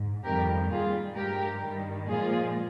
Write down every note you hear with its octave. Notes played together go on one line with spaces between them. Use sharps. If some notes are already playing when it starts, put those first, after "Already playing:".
Already playing: G#2
F2 D#3 G3 G4 A#4
A#2 G3 F4 G#4
G2 F3 G#3 G4 A#4
G2 D#3 G3
A#2 F3 G#3 F4 G#4